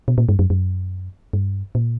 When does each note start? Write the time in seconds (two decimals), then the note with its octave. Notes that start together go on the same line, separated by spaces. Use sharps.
0.08 B2
0.18 A#2
0.29 G2
0.39 F#2
0.50 F#2
1.33 G2
1.75 A#2